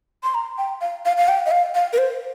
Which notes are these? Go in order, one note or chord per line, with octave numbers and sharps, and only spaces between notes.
C6
A#5
G5
F5
F5
F5
G5
D#5
F5
F5
A#4
C5